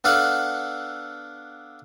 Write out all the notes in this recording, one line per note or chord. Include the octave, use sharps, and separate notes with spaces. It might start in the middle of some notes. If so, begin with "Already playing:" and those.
B3 D4 A4 F5 F#5